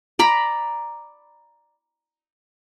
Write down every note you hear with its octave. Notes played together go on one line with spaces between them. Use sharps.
D5 A#5 B5